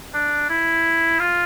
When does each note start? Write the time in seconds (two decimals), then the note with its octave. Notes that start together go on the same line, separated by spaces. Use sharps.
0.14 D4
0.49 E4
1.19 F4